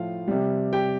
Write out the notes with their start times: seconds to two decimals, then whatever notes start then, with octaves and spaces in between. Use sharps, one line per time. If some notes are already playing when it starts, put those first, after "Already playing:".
Already playing: A2 F3 F4 F5
0.28 C3 G3
0.73 G4 G5